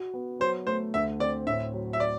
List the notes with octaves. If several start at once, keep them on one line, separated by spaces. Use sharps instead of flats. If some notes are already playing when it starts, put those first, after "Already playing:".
Already playing: F#4
B3
F#3 C5
A3 C5
D2 E5
C4 D5
A2 E5
F#3
E5
D5